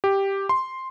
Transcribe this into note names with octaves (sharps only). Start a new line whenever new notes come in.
G4
C6